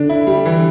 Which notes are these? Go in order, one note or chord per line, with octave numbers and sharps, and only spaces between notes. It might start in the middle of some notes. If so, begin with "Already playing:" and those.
Already playing: D3 D4
E4
G3
E3